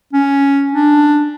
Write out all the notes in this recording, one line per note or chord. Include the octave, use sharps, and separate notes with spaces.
C#4
D4